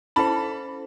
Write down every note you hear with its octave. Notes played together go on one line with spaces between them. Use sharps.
C#4 E4 A4 C5 A5 B5